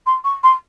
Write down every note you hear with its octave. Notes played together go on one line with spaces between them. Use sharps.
C6
C#6
C6